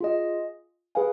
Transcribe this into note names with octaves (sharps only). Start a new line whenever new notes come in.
F4 G#4 D#5
G#4 B4 F5 G#5